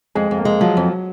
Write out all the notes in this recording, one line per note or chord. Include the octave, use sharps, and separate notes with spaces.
F2 G#3
F2
A#3
G#3
F3 F#3
F2